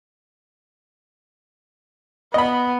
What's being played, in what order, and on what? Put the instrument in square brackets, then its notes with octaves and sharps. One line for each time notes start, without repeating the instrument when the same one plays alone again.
[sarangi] B3 [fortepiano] D#5 B5